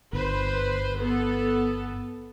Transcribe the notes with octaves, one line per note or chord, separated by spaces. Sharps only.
G1 B4 C5
B3 A4